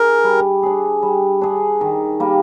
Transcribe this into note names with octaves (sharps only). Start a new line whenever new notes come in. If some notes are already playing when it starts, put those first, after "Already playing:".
Already playing: D4 G#4 A#4
G3
D4 G#4
G3
D4 G#4
D#3
G3 A#3